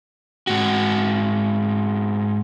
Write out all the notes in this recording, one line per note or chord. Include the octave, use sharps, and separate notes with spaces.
G#2 F#4